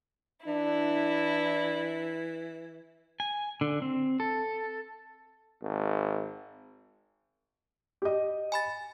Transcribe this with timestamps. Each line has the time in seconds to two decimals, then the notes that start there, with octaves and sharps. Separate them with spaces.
0.47 E3 D4 E4
3.20 G#5
3.61 D3
3.82 C4
4.20 A4
5.61 G#1
8.02 G4 D#5
8.52 G#5 B5 A6